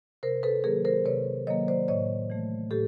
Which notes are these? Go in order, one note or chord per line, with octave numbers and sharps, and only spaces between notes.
C3 A#4 C5
A4 B4
D#3 F#3 A#3 G#4 A#4
A#4 C5
C3 B4 C#5
D#3 F#3 A#3 C#5 D#5
C5 D5
A2 C#5 D#5
E3 A3
A2 G4 A4